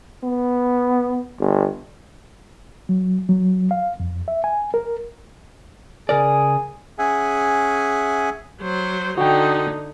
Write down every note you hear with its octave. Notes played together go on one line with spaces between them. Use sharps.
B3
G1
F#3
F#3
F5
F2
E5
G#5
A#4
C#3 G#4 A#4 D5
C#4 G#4 E5 F#5 G#5
F#3 C5
D3 D#4 F#4 G5